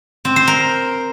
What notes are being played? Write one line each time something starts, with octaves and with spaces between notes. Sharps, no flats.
C4
C5
A#4